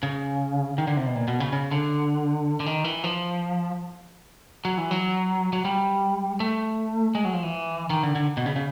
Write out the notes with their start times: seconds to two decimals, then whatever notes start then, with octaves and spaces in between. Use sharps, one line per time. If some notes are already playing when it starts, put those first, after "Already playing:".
0.03 C#3
0.78 D#3
0.87 D3
0.97 C3
1.07 B2
1.15 A#2
1.28 B2
1.40 C#3
1.53 C#3
1.71 D3
2.60 D3
2.66 D#3
2.84 E3
3.04 F3
4.65 F#3
4.78 E3
4.91 F#3
5.53 F#3
5.65 G3
6.40 A3
7.15 G#3
7.25 F#3
7.34 F3
7.43 E3
7.90 D#3
8.03 D3
8.15 D3
8.37 B2
8.46 C#3
8.56 C#3